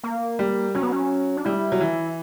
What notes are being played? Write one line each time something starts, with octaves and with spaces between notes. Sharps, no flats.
A#3
G3
F#3 C#4
B3
C#4
D4
G3 E4
F#3
E3